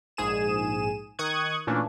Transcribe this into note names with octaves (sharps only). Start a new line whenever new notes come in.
A#1 G#2 G#4 D#7 E7
D#3 C#6 D#6 F#6 G#6
A#2 E3 A3 C#4 D4